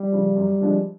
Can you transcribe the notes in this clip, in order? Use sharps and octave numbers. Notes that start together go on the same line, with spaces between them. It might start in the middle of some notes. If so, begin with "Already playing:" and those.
Already playing: G3
C#3 F3
F#2
D3 F3 G#3 C4